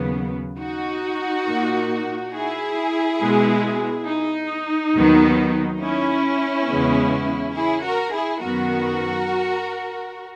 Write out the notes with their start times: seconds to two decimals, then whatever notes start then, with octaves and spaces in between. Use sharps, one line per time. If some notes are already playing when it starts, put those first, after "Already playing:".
Already playing: D#2 C#3 F#3 B3
0.60 D#4 F#4
1.47 A#2 A#3
2.33 E4 G#4
3.21 B2 G#3 B3
4.07 D#4
4.95 D#2 D#3 F#3 B3
5.81 C#4 E4
6.68 E2 C#3 G#3 B3
7.55 E4 G#4
7.84 F#4 A#4
8.14 E4 G#4
8.42 F#2 D#3 F#3 B3 F#4 A#4